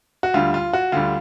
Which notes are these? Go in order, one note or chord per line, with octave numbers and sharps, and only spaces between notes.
F#4
D2 D3 G3 F4
F4
F#4
D2 D3 G3 F4